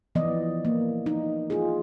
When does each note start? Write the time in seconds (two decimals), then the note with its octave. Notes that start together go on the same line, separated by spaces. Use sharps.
0.15 E3 F3 B3 D5 D#5
0.65 A#3
1.06 D#4
1.50 F4 G#4